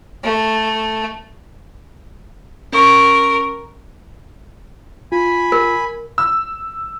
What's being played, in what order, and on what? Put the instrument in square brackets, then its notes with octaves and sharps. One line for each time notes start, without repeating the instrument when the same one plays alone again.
[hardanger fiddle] A3
[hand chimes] C#4 C#6 [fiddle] A#4
[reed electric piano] F4 [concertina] G#5 B5
[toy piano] A#4
[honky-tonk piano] E6